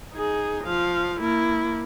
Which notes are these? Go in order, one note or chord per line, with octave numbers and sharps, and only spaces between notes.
D#4 G#4
F3 F5
A#3 E4